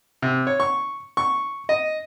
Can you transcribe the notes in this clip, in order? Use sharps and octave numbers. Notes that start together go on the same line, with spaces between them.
C3
C#5
C#6
C#6
D#5